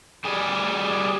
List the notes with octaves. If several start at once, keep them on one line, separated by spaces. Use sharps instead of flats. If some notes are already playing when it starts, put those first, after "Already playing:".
G3 G#4